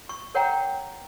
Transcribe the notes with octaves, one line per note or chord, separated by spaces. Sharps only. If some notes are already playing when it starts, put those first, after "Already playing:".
C#6
A#4 C#5 F#5 G5 A#5